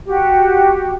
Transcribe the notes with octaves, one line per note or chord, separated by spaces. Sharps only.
F#4 G4